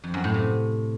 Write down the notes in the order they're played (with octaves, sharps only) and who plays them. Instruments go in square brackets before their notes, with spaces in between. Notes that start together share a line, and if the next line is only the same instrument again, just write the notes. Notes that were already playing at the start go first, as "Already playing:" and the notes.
[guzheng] F2
F#2
A2
C3